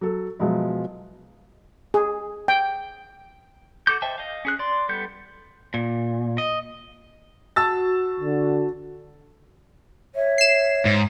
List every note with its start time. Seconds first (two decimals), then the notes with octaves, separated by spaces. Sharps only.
0.01 F#3 A4
0.39 B2 F3 F#3 G#3 E4
1.94 G#4
2.48 G5
3.87 F#4 A4 D6 G6
4.02 C5 D#5 E5 G5 A5
4.18 D#5 F5
4.45 C#4 G#4 F#6
4.59 D5 C6
4.89 G3 B3 A4 G6
5.74 A#2
6.38 D#5
7.56 F#4 A5 E6 A6
8.20 D3
10.15 C#5 E5
10.38 C7 E7
10.85 G#2